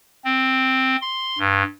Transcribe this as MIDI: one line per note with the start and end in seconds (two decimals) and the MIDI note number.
0.25 0.96 60
1.01 1.39 84
1.39 1.63 43